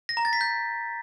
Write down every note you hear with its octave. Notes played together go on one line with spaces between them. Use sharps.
A#6
A#5
A6
B6
G6